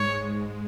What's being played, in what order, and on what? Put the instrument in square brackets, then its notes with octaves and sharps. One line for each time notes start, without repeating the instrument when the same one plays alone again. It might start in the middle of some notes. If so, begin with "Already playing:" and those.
Already playing: [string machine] G#2 G#3 [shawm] C#5